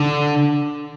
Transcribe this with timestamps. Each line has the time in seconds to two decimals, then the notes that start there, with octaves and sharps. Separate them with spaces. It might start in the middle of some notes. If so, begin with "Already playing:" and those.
Already playing: D3